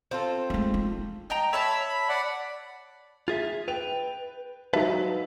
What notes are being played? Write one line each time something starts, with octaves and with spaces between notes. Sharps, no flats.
C4 F4 A4
G#3 A3
D#4
D#5 G5 A#5
C#5 E5 A5 B5 E6
B5
D5 F#5 B5
F4 G#4 E5 A6
B4 G5 F7
F#3 D#4 B4 E5 F5 A5